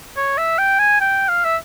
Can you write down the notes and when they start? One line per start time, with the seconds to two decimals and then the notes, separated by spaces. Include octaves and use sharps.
0.17 C#5
0.38 E5
0.58 G5
0.79 G#5
1.01 G5
1.29 F5
1.45 E5